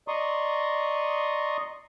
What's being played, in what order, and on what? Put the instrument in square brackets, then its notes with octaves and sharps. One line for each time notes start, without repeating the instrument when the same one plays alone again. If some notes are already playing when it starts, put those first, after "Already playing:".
[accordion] D5 D#5 A#5 C6 C#6 D#6